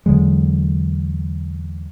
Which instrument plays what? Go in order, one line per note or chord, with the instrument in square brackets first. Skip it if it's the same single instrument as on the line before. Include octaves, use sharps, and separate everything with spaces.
[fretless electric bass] E2 D3 F#3 G#3